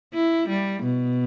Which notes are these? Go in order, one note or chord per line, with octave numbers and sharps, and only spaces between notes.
E4
G3
B2